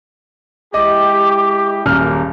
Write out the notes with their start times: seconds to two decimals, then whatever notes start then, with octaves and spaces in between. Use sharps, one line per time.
0.74 G#3 E4 G4 D#5 D6
1.86 D#1 F#2 C#3 A#3 F6